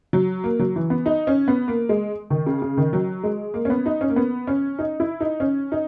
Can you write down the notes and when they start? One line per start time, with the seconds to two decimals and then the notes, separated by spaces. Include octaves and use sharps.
0.13 F#3
0.44 A#3
0.59 F#3
0.76 E3
0.90 B3
1.06 D#4
1.27 C#4
1.48 B3
1.68 A#3
1.89 G#3
2.30 D#3
2.46 C#3
2.62 C#3
2.77 D#3
2.93 F#3
3.24 G#3
3.54 A#3
3.65 C#4
3.70 B3
3.86 D#4
4.01 C#4
4.09 A#3
4.16 B3
4.47 C#4
4.79 D#4
5.00 E4
5.20 D#4
5.40 C#4
5.72 D#4